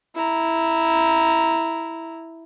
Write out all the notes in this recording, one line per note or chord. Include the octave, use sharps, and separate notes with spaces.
E4 A#5